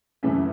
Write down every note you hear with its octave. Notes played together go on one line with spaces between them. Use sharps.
F#2 C#3 E3 A3 C#4 E4 E5